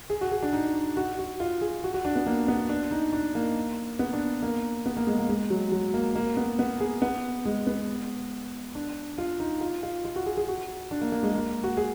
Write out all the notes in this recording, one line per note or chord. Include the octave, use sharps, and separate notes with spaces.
G#4
F#4
G#4
D4
D#4
F#4
F#4
F4
G#4
F#4
F#4
D4
B3
A#3
B3
D4
D#4
D4
A#3
B3
D4
A#3
B3
A#3
G#3
A#3
G#3
F#3
F#3
A#3
A#3
B3
B3
G#4
B3
G#3
B3
D4
F4
D#4
F4
F4
F4
F#4
G#4
G#4
F#4
D4
A#3
A#3
G#3
A#3
F#4
G#4